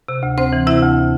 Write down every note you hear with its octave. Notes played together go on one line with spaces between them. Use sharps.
C3
D2
D2 C4 C5
E3
C3 E4 E5
D2